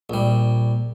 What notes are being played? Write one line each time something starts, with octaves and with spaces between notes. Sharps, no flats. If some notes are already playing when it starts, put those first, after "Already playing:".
A#1 G3